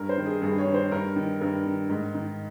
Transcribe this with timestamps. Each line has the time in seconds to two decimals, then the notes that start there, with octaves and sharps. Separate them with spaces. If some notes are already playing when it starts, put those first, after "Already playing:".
Already playing: G2 A#4
0.09 C5
0.17 D#3
0.26 G#4
0.42 G2 G#4
0.58 C#5
0.66 D#3
0.74 C5
0.91 G2 A#4
1.16 D#3
1.41 G2 A#4
1.65 D#3
1.89 G#2
2.14 D#3